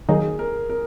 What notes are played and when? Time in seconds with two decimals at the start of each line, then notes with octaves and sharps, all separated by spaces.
0.09 D#3 F#3 A#3 D#4 G#4
0.39 A#4
0.70 A#4